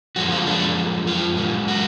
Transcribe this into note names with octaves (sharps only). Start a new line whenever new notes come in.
F#2 F3 G#3 F#4
F4
D4
F4
F#2 C#3 G#3
F#4